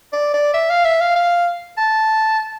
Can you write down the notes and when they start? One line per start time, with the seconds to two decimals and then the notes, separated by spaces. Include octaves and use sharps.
0.13 D5
0.34 D5
0.54 E5
0.70 F5
0.85 E5
1.01 F5
1.16 F5
1.77 A5